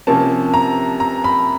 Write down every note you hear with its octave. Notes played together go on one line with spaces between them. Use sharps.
C3 F3 A#3 C#4 A5
A#5
A#5
B5